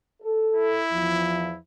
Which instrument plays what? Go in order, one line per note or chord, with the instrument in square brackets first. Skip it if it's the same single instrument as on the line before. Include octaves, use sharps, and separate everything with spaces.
[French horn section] A4
[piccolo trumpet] E4
[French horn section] E2 F3